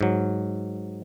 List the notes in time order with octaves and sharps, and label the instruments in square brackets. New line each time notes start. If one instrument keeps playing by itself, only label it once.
[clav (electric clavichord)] G#2 F#3